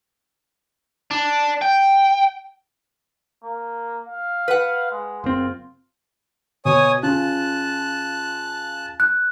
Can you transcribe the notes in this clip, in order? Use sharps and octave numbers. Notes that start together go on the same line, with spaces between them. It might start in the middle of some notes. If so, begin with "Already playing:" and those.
D4
G5
A#3
F5
B4 F#5
G#3
F#1 C4 F4
B2 C#5 G#5 D#6
C#3 F4 A5 F#6
F#6